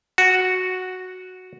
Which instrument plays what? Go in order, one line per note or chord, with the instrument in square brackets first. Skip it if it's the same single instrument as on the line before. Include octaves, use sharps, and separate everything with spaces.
[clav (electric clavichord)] F#4